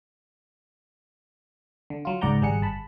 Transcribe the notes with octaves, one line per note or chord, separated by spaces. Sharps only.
D3
F#3 F4
C#2 G#2 D5 F#5 A#5 G6
G#1 G3 G#4 F#5 C#7
G1 A5 B5